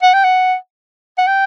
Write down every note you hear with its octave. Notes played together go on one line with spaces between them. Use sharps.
F#5
G5
F#5
F#5
G5